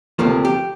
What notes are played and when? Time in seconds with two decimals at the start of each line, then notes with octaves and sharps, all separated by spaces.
0.19 D2 C3 F3 A3 A#3
0.45 G4